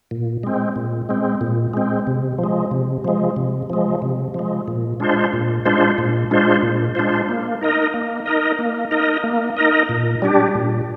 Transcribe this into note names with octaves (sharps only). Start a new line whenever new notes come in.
A#2
G#3 C4
A#2
G#3 C4
A#2
G#3 C4
C3
F3
G#3
C3
F3 G#3
C3
F3 G#3
C3
F3 G#3
A#2
G#3 D4 F4 C5
A#2
G#3 D4 F4 C5
A#2
G#3 D4 F4 C5
A#2
G#3 D4 F4 C5
A#3
D#4 A#4 D#5
A#3
D#4 A#4 D#5
A#3
D#4 A#4 D#5
A#3
D#4 A#4 D#5
A#2
G3 D4 G4
A#2